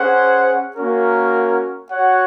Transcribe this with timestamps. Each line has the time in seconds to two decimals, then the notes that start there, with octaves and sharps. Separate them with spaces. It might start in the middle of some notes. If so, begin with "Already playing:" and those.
Already playing: C#4 G#4 C5 F#5
0.76 A#3 C#4 F#4 A#4
1.90 F#4 C#5 F#5